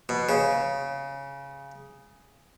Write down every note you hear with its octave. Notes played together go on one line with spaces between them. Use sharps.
B2
C#3